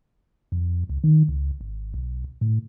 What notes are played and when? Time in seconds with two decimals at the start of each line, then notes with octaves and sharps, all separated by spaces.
0.52 F2
0.89 C#2
1.04 D#3
1.28 C#2
1.61 G#1
1.94 B1
2.41 A2